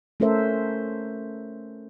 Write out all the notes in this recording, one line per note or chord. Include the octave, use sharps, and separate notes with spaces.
A3 C#4 A4 A#4 C5 E5